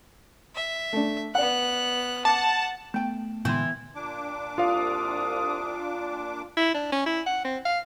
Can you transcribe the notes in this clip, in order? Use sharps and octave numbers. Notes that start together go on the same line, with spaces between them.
E5
A3 D4
B3 D5 F#5 F#6
F#5 A5 D6
A3 B3 G5
A#2 D3 E3 G#3 B3 E4 C6
A#2 D4 D6
C2 F4 F5 D#6
E4
D4
C#4
E4
F#5
C4
F5